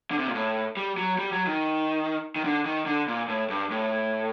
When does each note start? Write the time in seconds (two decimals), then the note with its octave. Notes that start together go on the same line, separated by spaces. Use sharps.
0.11 D3
0.19 C3
0.27 A#2
0.35 A2
0.77 G3
0.98 F#3
1.19 G3
1.32 F#3
1.47 D#3
2.36 D#3
2.44 D3
2.66 D#3
2.86 D3
3.08 A#2
3.28 A2
3.50 G2
3.71 A2